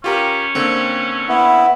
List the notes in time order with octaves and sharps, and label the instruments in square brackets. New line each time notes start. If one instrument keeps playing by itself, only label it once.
[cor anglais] C#4 [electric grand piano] F4 G4 A#4
[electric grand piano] D3 A#3 C4
[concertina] B3 E4